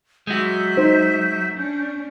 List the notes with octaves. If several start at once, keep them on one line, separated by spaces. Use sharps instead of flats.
F#3 G#3 F#4 E5 G6
D#4 C5
C#4 D4